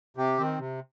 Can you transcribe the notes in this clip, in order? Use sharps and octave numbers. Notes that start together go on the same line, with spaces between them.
C3 G4
D#3 C4
C3